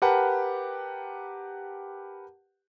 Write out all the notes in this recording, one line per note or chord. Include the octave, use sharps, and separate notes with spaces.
G4 A#4 B4 F#5 G5 A5